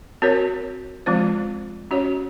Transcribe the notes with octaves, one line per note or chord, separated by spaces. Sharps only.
C4 F#4 A#4 C#5
F3 G#3 C4 F4 C5
C#4 F#4 C#5